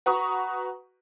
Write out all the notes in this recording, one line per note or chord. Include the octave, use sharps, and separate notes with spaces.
F#4 B4 A#5 C#6 D#6